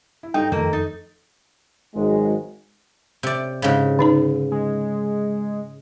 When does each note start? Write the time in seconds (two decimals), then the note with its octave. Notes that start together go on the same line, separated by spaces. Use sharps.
0.23 E4
0.34 G2 G3 D#4 A4 G5
0.52 F2 D#3 A3 A#3
0.73 D#4 A6
1.94 G#1 G#2 F#3 G#3
3.23 C3 D5
3.62 G#2 C#3
3.99 D3 D#4 A#5
4.52 G#3